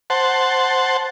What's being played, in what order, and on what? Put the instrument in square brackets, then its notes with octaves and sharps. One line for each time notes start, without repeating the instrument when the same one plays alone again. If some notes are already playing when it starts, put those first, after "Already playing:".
[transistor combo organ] C5 F#5 A5